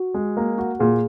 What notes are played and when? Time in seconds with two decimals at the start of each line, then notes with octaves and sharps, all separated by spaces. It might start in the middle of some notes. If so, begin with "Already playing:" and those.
Already playing: F#4
0.14 G#3
0.37 A#3
0.58 F#4
0.79 A#2 G#4